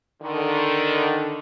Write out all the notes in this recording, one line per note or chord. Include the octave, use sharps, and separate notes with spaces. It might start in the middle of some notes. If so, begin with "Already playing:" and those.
D3 D#3